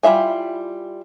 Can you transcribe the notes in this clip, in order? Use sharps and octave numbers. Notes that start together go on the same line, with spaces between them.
G3 E4 F4 E5 G#5